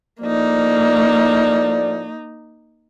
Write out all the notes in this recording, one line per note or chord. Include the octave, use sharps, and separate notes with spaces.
A2 F3 A#3 D#4 D5